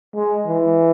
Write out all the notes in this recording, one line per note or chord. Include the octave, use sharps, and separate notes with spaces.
G#3
E3